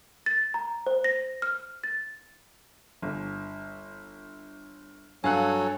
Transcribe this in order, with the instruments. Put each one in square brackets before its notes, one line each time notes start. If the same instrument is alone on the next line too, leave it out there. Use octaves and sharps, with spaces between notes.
[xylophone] A6
A#5
C5
A#6
F6
A6
[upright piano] G1
[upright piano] G2 F5 F#6 [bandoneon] F#3 A4 C#5 [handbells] G#5